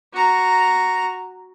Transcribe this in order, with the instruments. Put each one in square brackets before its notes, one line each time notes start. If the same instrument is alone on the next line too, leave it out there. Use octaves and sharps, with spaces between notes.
[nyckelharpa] F#4 A#5